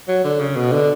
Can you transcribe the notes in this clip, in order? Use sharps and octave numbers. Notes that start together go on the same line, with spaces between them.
F#3
D3
C#3
B2
D3